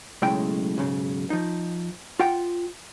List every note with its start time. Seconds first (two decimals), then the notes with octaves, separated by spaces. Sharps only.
0.22 B1 A2 C#3 G#3 E4 G5
0.78 B1 G#2 C#3
1.30 F3 D#4
2.20 F4 F#5 G5